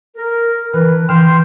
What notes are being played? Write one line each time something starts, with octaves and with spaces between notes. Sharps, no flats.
A#4
E3 D4 B4
E3 G5 C6 F6 E7